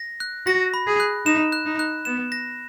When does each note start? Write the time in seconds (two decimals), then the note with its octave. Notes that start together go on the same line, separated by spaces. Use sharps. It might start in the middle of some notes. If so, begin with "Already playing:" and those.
Already playing: A#6
0.20 F#6
0.46 F#4 A#6
0.74 B5
0.87 G#4
1.00 F#6
1.26 D#4 E7
1.52 F#6
1.66 D#4
1.79 F#6
2.05 B3 E7
2.32 A#6